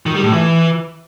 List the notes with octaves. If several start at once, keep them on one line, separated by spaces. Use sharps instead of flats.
D#3
G3
A2
E3